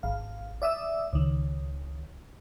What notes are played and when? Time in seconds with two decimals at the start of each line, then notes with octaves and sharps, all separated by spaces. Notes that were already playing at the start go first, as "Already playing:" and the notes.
0.03 G#1 F5
0.62 D5 E5 D#6 E6
1.13 C#2 D#3